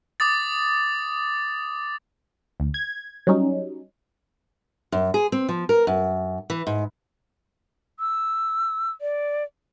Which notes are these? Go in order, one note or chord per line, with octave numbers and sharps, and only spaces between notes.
D6 D#6 A6
D2
G#6
F#3 G3 C#4 D#4
F#2
G#4
C4
F3
A#4
F#2
E3
G#2
E6
D5